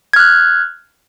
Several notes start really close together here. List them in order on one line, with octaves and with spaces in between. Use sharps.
G#6 F6 F#6